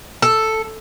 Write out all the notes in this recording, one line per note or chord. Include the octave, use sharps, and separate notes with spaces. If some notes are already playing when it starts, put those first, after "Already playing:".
A4